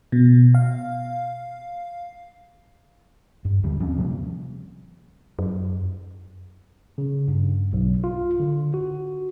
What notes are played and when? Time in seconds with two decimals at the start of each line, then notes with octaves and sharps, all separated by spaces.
0.12 B2
0.55 F5
3.45 G2
3.63 D#2 D3 G3
3.80 F3 C4 C#4
3.98 C3 F3 G3 A#3
5.39 F#2
6.98 C#3
7.28 G2
7.73 B1
8.04 F4
8.40 D3
8.74 F#4